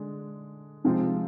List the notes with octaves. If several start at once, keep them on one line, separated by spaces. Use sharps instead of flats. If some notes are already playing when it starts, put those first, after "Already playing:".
Already playing: D3 G#3 D4
C3 F3 G#3 C4 F4